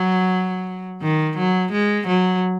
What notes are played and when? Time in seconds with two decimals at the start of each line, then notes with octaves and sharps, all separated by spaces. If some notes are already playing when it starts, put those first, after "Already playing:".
Already playing: F#3
1.02 D#3
1.37 F#3
1.72 G#3
2.07 F#3